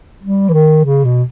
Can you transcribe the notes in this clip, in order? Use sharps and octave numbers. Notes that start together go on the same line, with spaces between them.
G3
E3
D#3
C#3
B2